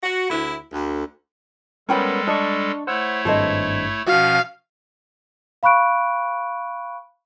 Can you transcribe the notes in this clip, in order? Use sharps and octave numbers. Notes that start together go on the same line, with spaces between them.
F#4
D2 E4
D2
G3 G#3 B3 C#4 A4 A#4 G5 B5
D4 D#5 A5 C#6
A3 E4 C5 C#5 F#5 E6
G#1 G2 A4 C5 D#5
B2 F3 C#4 F#4 F5 F#5
F5 B5 C#6 F#6 D7